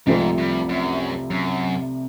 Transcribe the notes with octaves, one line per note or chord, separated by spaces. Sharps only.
C2 G#2 C3 F3 A3 C4
G2
F#2
F#2